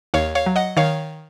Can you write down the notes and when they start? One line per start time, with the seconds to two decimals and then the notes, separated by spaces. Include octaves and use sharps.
0.14 D#2 C#5 F5
0.35 C#5 F5
0.46 F#3
0.56 D#5 F#5
0.77 D#3 C#5 F5